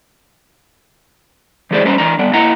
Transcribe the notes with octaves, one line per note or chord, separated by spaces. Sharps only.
E3 G#3 G4 G#4 C5 D5
G3 C#4 B4 C5 A#5
E3 D4 A#5
G3 B3 D4
A#3 E4 D#5 F#5 A#5